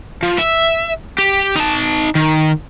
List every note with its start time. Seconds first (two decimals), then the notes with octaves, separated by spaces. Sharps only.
0.23 F3
0.39 E5
1.19 G4
1.56 D#4 A5
2.15 D#3